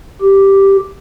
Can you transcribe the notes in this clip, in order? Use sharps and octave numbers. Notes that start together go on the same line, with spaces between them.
G4